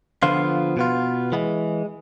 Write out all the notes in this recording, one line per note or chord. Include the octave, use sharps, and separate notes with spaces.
D3 F3 B3 F4
B2 B3 F4
E3 G#3 B3